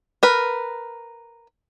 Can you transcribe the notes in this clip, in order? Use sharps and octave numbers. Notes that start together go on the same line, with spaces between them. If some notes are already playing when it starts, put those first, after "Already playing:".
A#4 B4